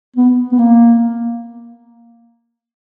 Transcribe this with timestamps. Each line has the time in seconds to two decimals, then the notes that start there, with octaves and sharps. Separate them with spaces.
0.16 B3
0.52 B3
0.59 A#3